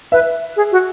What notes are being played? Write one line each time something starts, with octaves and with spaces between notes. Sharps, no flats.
B4 E5
G#4
F#4